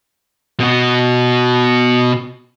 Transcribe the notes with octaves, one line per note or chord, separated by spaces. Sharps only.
B2 F#4